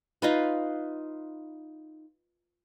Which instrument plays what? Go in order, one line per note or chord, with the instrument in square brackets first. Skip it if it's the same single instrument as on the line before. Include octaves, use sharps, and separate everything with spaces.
[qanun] D#4 F4 B4